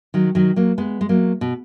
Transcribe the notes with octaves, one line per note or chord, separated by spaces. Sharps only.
D#3 F#3
D#3 F#3
F#3 A#3
G#3 B3
G#3
F#3 A#3
B2